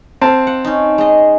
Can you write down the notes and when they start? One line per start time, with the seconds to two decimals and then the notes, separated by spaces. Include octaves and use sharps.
0.21 C4 F5 A5
0.47 F#5
0.64 C#4 D#4
0.98 G#3 D#5